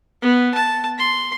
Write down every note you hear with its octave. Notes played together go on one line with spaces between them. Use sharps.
B3
A5
C6